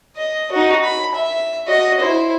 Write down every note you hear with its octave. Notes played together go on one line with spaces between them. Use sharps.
D#5
D#4 F#4
B5
E5
F#4 D#5
E4 C5